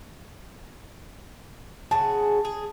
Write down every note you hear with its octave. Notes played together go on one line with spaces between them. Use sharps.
C#3 F#4 G#4 A5
G#4